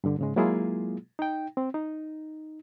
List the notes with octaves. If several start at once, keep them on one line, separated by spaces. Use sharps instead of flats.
G2 D3
G#2 C#3 G#3
F#3 G#3 A#3 E4 F4 G#4
D#4 G5
C4
D#4